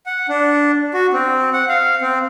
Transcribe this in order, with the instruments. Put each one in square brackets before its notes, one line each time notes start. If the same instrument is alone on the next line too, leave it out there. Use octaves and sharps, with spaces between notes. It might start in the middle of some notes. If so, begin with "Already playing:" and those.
[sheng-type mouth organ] F#5
D4
F#4
C4
F#5
F5
C4